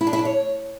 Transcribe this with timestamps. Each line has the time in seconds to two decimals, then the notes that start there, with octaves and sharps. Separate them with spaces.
0.01 E4
0.07 D4
0.13 E4
0.19 D4
0.25 C#5